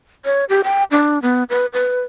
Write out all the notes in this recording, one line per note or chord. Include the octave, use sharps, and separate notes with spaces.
C#5
G4
G5
D4
B3
B4
B4